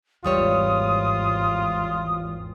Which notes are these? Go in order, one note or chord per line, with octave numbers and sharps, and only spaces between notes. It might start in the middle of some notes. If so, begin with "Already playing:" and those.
G#1 E2 G#2 G3 F4 C#5 D#6